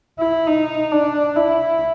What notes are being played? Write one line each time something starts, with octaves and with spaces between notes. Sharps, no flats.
E4
D#4
D4
E4